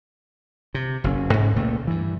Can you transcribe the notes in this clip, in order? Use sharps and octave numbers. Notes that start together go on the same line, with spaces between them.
C3
F#1 B2 C#4
G#2 C#4
C#2 A#2 A3
G2 E3